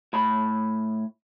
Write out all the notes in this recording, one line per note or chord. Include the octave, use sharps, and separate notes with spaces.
A2 B5